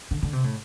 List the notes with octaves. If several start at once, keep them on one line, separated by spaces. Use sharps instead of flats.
D3
D3
C3
A2